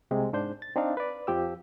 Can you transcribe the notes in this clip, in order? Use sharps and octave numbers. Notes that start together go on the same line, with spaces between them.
C2 C3 G#3 C4
G#2 D4 C5 G6
A6
C4 D4 D#4 F5
B4 D5
F2 F3 G4 E6